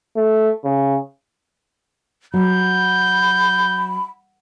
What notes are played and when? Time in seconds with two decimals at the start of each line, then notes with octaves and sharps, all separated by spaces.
0.16 A3
0.64 C#3
2.34 F#3 B5 G6